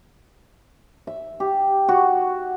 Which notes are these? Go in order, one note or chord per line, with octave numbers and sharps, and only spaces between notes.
E5
G4
F#4